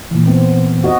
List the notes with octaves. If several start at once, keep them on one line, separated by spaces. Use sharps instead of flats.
A#2 E3
B3 C4
F#4 D#5